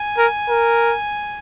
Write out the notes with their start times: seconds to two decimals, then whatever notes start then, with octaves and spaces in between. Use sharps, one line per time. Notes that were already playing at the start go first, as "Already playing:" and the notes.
Already playing: G#5
0.18 A#4
0.49 A#4